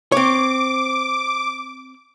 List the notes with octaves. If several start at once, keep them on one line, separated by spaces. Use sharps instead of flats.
C4 C#5 D6